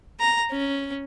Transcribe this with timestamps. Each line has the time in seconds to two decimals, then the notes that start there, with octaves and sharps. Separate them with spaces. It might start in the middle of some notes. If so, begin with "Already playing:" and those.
0.20 A#5
0.52 C#4